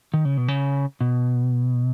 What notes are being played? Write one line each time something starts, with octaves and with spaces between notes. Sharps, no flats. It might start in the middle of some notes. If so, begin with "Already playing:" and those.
D#3
C#3
B2
C#3
B2